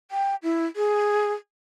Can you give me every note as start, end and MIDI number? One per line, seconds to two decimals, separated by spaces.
0.11 0.35 79
0.43 0.66 64
0.76 1.33 68